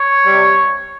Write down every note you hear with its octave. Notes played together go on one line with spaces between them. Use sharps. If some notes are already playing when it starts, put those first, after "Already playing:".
Already playing: C#5
C3 G3